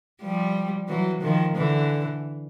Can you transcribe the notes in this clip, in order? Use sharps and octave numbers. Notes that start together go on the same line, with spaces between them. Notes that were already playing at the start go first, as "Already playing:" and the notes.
F3 G3
E3 F#3
D#3 F3
D3 E3